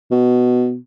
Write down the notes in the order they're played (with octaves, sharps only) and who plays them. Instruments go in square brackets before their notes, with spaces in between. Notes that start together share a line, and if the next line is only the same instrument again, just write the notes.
[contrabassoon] B2